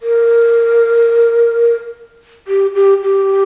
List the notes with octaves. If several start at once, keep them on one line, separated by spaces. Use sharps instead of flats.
A#4
G4
G4
G4